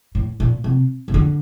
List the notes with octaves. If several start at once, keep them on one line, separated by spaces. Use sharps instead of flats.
A2
A#2
C3
C3
D3